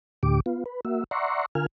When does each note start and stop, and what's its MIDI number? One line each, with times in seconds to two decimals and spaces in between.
0.23 0.40 38
0.23 0.40 45
0.23 0.40 50
0.23 0.40 67
0.23 0.40 86
0.46 0.64 59
0.46 0.64 65
0.66 0.81 71
0.85 1.04 58
0.85 1.04 66
0.85 1.04 76
1.11 1.46 74
1.11 1.46 76
1.11 1.46 78
1.11 1.46 82
1.11 1.46 84
1.11 1.46 85
1.55 1.66 50
1.55 1.66 65
1.55 1.66 70
1.55 1.66 80
1.55 1.66 89